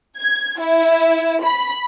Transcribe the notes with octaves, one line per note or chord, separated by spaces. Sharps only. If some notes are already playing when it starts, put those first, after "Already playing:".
G#6
E4
B5